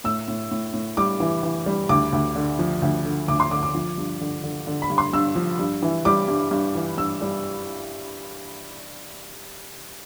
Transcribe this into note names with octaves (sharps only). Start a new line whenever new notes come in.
A2 E6
A2
A2
A2
G3 D6
E3
E3
G3
D2 D6
D2
D3
F3
D2
D3
D2 D6
C6
D3 D6
D6
F3
G2
D3
D3
D3
B5
G2
C6
G2 E6
F3
G2
E3
G3 D6
G2
G2
E3
G2 E6
G3